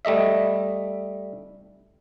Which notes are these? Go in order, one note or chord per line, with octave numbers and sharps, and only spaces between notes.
G3 A3 D#5 E5